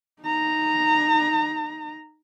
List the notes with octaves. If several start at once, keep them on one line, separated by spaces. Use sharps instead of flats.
D#4 A#5